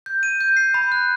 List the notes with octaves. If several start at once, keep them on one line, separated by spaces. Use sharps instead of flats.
G6
D#7
G6
C7
B5
F#6